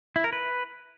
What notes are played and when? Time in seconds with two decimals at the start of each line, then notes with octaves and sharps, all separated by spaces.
0.16 E4
0.24 A#4
0.33 B4